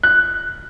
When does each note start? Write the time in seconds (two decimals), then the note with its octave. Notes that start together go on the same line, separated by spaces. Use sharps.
0.03 F#6